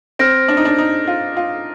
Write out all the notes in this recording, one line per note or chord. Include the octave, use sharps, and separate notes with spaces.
C4 F6 A#6 D7
D4
D#4
D4
D#4
F4
F4